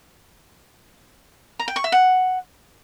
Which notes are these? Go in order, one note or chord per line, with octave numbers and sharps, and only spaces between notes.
A#5
G5
C#6
E5
F#5